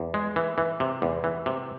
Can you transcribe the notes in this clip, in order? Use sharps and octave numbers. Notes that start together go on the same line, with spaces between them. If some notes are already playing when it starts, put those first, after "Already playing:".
Already playing: E2
G#3
E3
E3
C3
E2
E3
C3